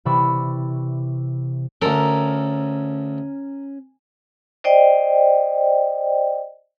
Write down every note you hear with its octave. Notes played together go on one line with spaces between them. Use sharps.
C3 E3 D5 B5 C#6 E6
D2 C#4 A4 A#4
C5 D5 D#5 G5